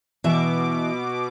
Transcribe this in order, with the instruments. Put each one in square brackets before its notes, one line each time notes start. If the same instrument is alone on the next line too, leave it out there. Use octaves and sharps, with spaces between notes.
[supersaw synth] B2 D6 [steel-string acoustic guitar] E3 E5